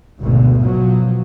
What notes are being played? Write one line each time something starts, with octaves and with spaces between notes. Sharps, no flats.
G#1 D2 B2
B2 F3 F#3